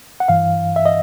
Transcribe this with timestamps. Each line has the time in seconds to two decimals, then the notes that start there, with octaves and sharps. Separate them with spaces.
0.20 F#5
0.28 G2 E3 F5
0.76 E5
0.86 D#5